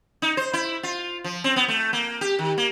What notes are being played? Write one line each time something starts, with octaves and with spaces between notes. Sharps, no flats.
D#4
C5
E4
F4
F3
C4
B3
A3
A#3
G4
D#3
A#3